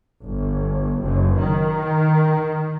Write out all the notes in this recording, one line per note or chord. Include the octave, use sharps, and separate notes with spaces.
G1
F#1
D#3